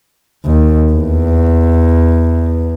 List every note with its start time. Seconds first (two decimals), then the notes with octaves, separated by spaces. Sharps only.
0.45 D#2
0.92 E2